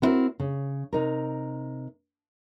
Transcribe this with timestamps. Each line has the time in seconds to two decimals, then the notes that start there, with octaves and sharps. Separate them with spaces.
0.02 B3 C4 E4 F#4 A#4
0.40 C#3
0.93 C3 D#4 A#4